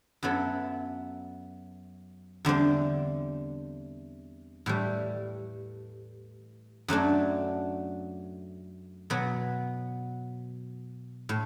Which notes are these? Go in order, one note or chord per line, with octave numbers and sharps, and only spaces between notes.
F#2 F#3 B3 E4 A4
E2 D3 G3 C4
A2 E3 G3
F#2 F#3 A3 D4
B2 F#3 B3
A2